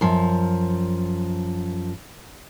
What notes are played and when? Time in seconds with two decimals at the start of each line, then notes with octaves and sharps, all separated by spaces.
0.01 F#2 F3